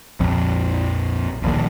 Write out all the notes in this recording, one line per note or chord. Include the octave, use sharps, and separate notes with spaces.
A#1 F2
D#1 A#1 D#2